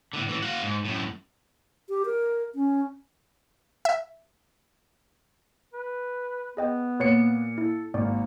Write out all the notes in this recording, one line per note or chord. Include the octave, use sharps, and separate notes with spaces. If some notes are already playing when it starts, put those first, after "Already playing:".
A2 D3
A2 E3
F#4 F5
G#2
F#2 A2
G4
A#4
C#4
E5
B4
B3 G#4 D#5 G5
A#2 B4 C#5 C7 C#7
E4 A4
G#1 A#3 D5